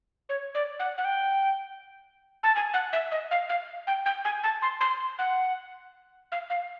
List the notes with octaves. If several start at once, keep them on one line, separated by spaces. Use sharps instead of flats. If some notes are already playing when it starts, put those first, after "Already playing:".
C#5
D5
F#5
F#5
G5
A5
G#5
F#5
E5
D#5
F5
F5
G5
G5
G#5
A5
C6
C6
F#5
F5
F5